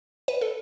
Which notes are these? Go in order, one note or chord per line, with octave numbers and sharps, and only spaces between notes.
B4
A4